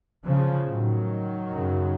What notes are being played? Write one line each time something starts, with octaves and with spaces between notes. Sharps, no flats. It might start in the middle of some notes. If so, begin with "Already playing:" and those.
C#3 F3
A2 D#3 F#3
F#2 C#3